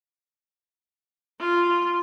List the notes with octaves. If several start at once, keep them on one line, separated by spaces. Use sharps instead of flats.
F4